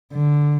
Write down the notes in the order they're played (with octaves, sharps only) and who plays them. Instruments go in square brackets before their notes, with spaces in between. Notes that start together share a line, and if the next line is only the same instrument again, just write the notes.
[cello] D3